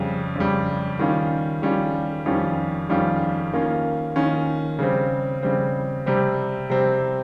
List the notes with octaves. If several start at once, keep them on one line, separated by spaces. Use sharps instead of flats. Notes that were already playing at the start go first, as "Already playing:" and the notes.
Already playing: F2 C#3 G3
F2 C#3 G3
D#3 G3 C#4 F4
D#3 G3 C#4 F4
F2 D#3 G3 C#4 F4
F2 D#3 G3 C#4 F4
D#3 A#3 C#4 F4
D#3 A#3 C#4 F4
C#3 G3 C4
C#3 G3 C4
C3 G3 C4
C3 G3 C4